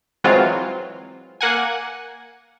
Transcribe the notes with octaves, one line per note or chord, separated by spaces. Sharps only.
E3 F#3 G#3 C4 F4
A#3 F#5 G#5